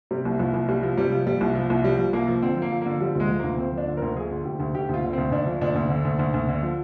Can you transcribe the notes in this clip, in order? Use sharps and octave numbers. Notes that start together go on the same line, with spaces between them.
C3 G3
C2
C2 F3
C2
C2 G3
F3
C3 G3
F3
F3 G3
C2
F3
C2
F3 G3
F3
C2 A#3
F3
D3 C4
F3 A#3
F3
D3 A#3
F3 G3
D2 G#3
F3
D2 A#3
D2 C4
F3 D4
D3
D2 A#4
F3 G#4
D3
D2 G4
D2
D2 G4
D2 F4
D3
D2 C4
D2 D4
F3
D2 D4
D2
D3
D2
D2
D2
D3
F3